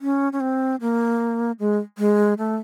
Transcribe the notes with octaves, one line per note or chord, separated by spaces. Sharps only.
C#4
C#4
C4
A#3
G#3
G#3
A3